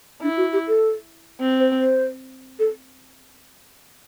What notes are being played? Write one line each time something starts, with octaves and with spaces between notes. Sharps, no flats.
D4 E4
F#4
G4
A4
C4
C5
C5
A4